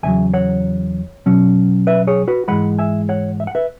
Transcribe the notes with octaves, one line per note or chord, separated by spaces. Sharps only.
E2 C#3 F#3 E5 G#5
C#5 F#5
B2 F#3 C#4
B4 E5
G#4 C#5
F#4 B4
G#2 E3 G#3 F#5 B5
E5 G#5
C#5 F#5
E5
F#5
B4 E5